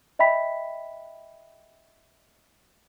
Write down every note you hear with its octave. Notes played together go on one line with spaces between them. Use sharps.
D#5 E5 G5 B5 B6